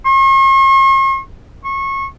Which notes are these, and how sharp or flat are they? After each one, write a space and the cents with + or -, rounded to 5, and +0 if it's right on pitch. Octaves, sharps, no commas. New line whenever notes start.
C#6 -45
C#6 -25